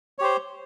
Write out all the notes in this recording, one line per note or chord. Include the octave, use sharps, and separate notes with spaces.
G4 C5 C#5